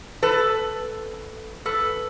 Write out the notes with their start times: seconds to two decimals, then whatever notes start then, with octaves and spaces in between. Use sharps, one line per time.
0.22 A4 B4
1.66 A4 B4